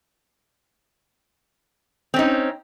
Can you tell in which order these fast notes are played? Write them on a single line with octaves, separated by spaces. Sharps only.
C4 C#4 D#4